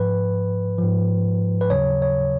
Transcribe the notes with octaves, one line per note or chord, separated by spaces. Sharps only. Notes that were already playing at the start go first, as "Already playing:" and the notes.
Already playing: G#2 F3 B4
G#2 F3
B4
D#2 C#3 F#3 C#5
C#5